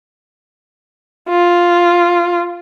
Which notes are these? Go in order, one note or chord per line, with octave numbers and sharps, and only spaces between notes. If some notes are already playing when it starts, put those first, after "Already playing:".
F4